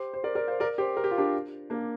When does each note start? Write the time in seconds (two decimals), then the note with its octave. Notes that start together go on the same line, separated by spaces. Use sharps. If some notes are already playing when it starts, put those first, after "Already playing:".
Already playing: G4 C5
0.14 C5
0.24 A#4 D5
0.35 A#4 D5
0.47 C5 F5
0.60 A#4 D5
0.78 G4 C5
0.97 A#4
1.04 G4
1.11 F4
1.18 D4 G4
1.70 A#3 D4